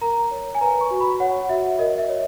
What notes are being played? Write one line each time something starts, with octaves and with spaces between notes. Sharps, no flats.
A#4 A#5
C#5
G#5
B4 A#5
C#6
F#4
B5
C#5 F#5
F#4 E5
A#4 D#5
E5
C#5